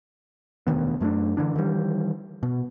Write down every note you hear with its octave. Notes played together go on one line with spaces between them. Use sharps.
E1 D2 D#3 B3
F#2 A3 C#4 D4
D3 E3 D4
D#3 E3 G3
B2